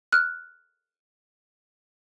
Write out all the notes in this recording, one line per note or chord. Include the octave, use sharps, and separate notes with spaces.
F6 F#6